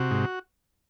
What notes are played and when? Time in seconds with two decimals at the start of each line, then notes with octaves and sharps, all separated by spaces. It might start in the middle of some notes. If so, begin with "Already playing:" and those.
Already playing: C3 F#4
0.11 G#2